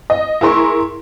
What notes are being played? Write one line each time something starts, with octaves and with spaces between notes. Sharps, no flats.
D#5
E4 G#4 A#4 C6 C#6